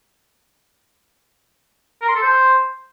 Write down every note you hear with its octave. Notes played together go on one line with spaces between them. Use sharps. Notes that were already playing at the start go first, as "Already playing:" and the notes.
A#4
C6
A4
C5